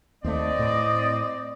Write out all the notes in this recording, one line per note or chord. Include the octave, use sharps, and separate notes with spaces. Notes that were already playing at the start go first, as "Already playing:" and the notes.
D#2 A3 C4 D5 D#5
A2